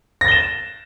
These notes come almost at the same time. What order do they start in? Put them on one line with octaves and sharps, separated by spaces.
A#6 A6 G7 E7